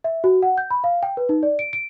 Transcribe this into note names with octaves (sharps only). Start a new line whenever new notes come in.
E5
F#4
F#5
G6
B5
F5
G5
B4
D#4
D5
D7
D7